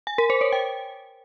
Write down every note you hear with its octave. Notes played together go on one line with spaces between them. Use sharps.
G#5
A#4
C5
C#5
G5